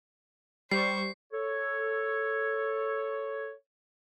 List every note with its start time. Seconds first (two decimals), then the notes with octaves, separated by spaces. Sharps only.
0.71 G3 C5 C#6 C7
1.32 A4 C#5